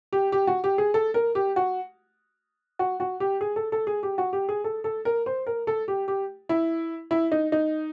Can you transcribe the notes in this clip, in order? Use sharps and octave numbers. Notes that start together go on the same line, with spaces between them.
G4
G4
F#4
G4
G#4
A4
A#4
G4
F#4
F#4
F#4
G4
G#4
A4
A4
G#4
G4
F#4
G4
G#4
A4
A4
A#4
C5
A#4
A4
G4
G4
E4
E4
D#4
D#4